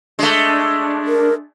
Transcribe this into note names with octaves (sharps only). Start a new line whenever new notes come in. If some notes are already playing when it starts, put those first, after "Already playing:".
G#3 A3 D4
A#4